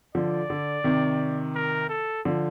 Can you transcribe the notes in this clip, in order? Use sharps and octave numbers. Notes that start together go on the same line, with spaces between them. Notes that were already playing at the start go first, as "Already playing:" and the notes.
D3 F3 D5
D3
C3 D#3
A#4
A4
D3 F3